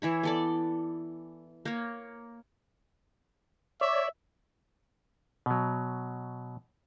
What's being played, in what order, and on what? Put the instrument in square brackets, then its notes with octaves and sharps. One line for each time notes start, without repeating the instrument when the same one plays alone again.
[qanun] E3 E4 C#5
B3 A4 D5
A#3 C#5
[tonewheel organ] C#5 D5 [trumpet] E5
[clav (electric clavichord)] B2 F#3